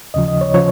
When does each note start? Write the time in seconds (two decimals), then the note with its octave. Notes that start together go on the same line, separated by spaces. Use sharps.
0.14 D#2 C#3 F3 D#5
0.28 D#5
0.41 C#5
0.54 C#3 F3 C#5